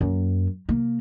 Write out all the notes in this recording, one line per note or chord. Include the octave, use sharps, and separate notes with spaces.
F#2 A#3
C3 A#3